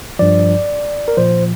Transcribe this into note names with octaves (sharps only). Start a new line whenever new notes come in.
G2 F3 D5
A#4
A#2 F3 C5